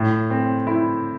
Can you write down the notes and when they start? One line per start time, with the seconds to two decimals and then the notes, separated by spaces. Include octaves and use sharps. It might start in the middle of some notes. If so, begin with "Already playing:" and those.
Already playing: A2
0.30 C4
0.67 E4